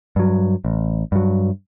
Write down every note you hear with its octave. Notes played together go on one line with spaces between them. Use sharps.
G2 F#3
A1
G2 F#3